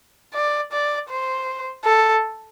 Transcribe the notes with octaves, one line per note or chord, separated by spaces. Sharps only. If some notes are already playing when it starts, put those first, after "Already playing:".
D5
D5
C5
A4